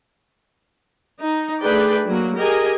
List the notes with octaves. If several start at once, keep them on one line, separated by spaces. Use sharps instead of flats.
D#4
A3 D4 G#4 B4 D5 G5
F#3 A#3 F#4
G4 G#4 A#4 D#5 G#5 A#5